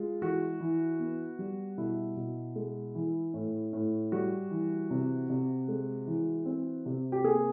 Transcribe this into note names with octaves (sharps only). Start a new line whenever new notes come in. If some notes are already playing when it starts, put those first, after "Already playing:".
Already playing: G#3 F4
E3 F#4
E3
B3
G3
B2 E4
B2
G#3
E3
A2
A2
G3 F#4
E3
C3
C3
G#3
E3
C4
C3
G4
A#3 G#4